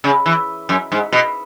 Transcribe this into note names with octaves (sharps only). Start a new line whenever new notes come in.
C#3
E3
F#2
G#2
B2